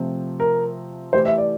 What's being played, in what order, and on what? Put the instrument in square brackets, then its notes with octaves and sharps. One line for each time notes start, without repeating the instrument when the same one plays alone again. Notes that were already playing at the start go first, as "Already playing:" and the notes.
Already playing: [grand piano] C3 F3 A3 C4
[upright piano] A#4
[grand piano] E3 A3 E4 G4 [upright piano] C5
[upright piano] E5
D5